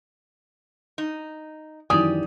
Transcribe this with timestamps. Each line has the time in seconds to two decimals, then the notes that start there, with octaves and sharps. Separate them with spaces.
0.98 D#4
1.90 F#2 D#3 E3 G4 D5 G#5 D#6